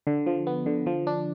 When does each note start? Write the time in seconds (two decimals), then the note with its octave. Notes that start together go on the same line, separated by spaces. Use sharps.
0.07 D3
0.26 F3
0.47 B3
0.66 D3
0.86 F3
1.07 D4